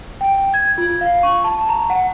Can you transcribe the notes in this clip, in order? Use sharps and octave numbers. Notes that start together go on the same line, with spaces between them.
G5
G#6
F4
F5
C#6
A5
A#5
F#5